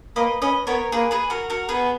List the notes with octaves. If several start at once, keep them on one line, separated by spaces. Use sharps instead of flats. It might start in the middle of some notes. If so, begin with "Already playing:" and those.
A#3 B4 D#5
C#4 B4 D#5
B3 A#4 C#5
A#3 G#4 B4
G#4 B4
F#4 A#4
F#4 A#4
B3 G#4 B4